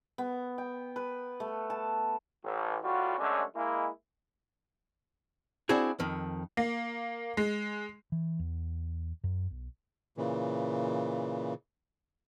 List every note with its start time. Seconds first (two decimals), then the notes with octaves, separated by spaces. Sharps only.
0.18 B3
0.58 G5
0.96 B4
1.40 A3
1.70 A5
2.44 A1
2.83 A2 G3 F4 F#4
3.18 F#2 D3 G#3 A3 C#4 D4
3.55 G#3 A#3 E4
5.69 C4 D4 E4 F#4 G#4
6.00 F2 D#3
6.57 A#3
7.37 G#3
8.12 E3
8.39 E2
9.24 F#2
9.51 B1
10.17 A#2 C#3 E3